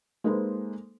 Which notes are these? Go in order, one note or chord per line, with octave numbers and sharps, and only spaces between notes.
G#3 A#3 D#4 A4 B4 C5